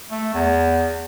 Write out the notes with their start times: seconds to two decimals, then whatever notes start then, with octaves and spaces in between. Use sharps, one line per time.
0.11 A3
0.34 E2